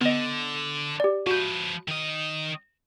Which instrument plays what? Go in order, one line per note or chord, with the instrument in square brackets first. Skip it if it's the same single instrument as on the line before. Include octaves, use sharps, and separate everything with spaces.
[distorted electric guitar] D3 [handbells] B3 D#5
[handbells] G4 D5
[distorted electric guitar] F3 B4 [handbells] F#4 G6
[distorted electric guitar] D#3 D#5